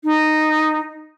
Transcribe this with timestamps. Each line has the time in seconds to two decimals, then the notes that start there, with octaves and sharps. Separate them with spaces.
0.04 D#4